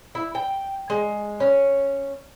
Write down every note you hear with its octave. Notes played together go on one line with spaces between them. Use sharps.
E4
G5
G#3
C#4